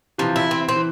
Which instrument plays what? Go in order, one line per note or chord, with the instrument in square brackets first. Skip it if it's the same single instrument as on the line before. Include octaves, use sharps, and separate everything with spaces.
[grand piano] C3 E3 [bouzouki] F3
[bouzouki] E4
C4
C4
[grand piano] E3